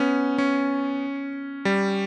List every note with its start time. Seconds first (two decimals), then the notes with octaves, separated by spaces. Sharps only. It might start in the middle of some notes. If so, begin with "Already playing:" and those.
Already playing: B3 C#4
0.38 C#4
1.65 G3